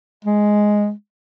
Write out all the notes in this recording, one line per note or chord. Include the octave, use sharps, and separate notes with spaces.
G#3